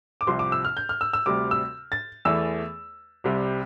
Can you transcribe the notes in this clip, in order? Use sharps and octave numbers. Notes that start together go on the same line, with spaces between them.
D6
C2 C3 F3 C6
D6
E6
F6
G6
F6
E6
E6
D2 C3 G3 D6
E6
A6
E2 E3 A3 E6
C2 C3 G3